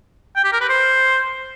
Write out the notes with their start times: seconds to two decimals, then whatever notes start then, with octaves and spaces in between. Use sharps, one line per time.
0.36 G5
0.44 G4
0.52 A#4
0.61 B4
0.69 C5